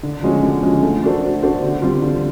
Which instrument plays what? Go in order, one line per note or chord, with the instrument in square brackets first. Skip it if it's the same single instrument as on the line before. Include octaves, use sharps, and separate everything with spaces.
[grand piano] D3
F3 G#3 C#4 F#4
D3
F3 G#3 C#4 F#4
A3
D4 F#4 A4 C5
A3
D4 F#4 A4 C5
D3
G3 C4 F4
D3